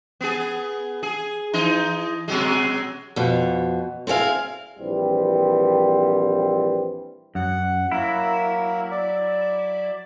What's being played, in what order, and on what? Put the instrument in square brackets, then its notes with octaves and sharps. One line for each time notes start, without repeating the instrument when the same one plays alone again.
[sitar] B3 G#4
G#4
E3 D#4
B2 F#3 G#3
[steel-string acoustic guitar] F2 B2
C4 E4 G#4 F5
[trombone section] A#1 E3 G3 C4 C5
[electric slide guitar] F#2 [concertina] F#5
[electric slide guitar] F#3 E4 [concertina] A#3 A#4
[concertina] D5